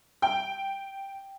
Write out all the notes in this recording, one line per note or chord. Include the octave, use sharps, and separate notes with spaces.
G5